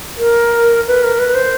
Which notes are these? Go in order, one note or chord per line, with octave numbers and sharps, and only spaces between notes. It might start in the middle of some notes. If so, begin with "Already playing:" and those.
A#4
B4
A#4
B4
C5